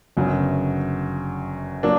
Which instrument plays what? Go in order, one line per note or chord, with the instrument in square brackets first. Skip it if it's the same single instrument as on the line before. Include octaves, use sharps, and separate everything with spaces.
[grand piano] G1 F#2 C#3 F#3
F#3 A#3 D4